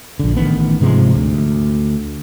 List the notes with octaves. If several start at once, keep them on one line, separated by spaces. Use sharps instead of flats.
A#1 D3
A1 D#3 B3
G#2 C3 F3 G#3
D2